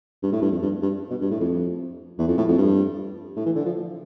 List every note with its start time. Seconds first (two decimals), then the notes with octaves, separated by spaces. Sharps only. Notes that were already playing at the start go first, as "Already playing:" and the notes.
0.23 G2
0.32 A2
0.42 G2
0.52 F2
0.62 G2
0.82 G2
1.10 B2
1.21 G2
1.31 A2
1.40 F2
2.19 E2
2.28 F2
2.38 A2
2.48 F2
2.58 G2
3.36 A2
3.46 E3
3.56 D3
3.65 F3